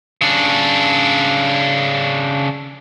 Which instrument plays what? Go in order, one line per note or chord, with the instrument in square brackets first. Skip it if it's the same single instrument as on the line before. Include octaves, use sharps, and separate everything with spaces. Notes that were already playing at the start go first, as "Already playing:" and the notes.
[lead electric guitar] C#3 D4